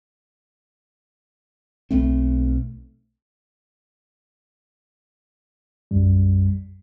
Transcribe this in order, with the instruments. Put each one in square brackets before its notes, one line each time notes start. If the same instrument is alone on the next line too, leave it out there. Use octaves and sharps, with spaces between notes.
[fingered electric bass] B1 A3 C4
[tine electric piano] B1 F#2 G3